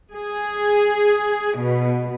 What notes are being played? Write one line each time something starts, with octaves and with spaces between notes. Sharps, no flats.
G#4
B2